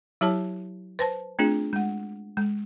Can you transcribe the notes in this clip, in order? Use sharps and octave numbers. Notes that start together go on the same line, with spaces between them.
F#3 E4 G4 C#5 A5
B4 C5 A5
A3 C4 D4 F4 G#4
G#3 F#5
G#3